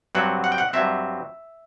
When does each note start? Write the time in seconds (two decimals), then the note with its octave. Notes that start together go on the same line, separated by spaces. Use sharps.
0.15 G2 F#3 C4 F#5
0.44 F#5
0.52 G5
0.58 F#5
0.73 G2 F#3 C4 E5